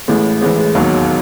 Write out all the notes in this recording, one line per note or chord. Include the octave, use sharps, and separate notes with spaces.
A1 A2 E3 G#3
A1 A2 E3 G#3
G#3
E1 D#2 D#3 F#3